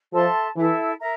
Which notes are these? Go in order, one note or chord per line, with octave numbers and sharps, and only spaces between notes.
F3 A4 E5 A5 C6
E3 E4 A4 E5
A#4 E5 A#5